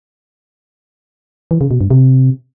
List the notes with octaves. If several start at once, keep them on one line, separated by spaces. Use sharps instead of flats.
E3
C#3
B2
G2
C3